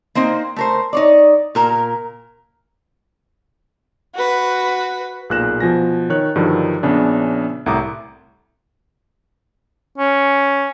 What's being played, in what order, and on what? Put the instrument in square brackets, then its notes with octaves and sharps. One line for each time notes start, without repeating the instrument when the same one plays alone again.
[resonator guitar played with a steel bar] A#3 C4 D#4 C5
A3 A#4 C5
D#4 C#5 D5
A#2 A#4 A#5
[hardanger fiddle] F#4 B4
[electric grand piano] B1 A#2 G#4 F#6 A#6 E7
B2 F3 G#5 A#6
D#3 C#5 F#6
G2 D3 D#3 F3 F#3
A#1 C#3 B3 C#4 D4
C2 A2 A#5 D6 D#6
[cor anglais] C#4